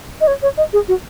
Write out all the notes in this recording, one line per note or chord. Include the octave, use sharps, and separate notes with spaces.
D#5
C#5
C#5
D#5
G#4
F#4